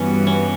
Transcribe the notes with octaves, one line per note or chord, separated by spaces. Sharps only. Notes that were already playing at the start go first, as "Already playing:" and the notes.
Already playing: G2 E3 G3 B3 C#4 F#4
C#4